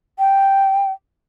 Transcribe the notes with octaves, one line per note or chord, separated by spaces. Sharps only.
G5